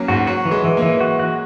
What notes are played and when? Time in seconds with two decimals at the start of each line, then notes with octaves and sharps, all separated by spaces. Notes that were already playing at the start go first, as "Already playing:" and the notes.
Already playing: F#3 A#3 C#4
0.08 G#2 F#4
0.27 F#3 F#4
0.45 E3
0.51 G#3
0.64 E3
0.77 A#3
0.82 E3
1.01 F#4
1.19 F#4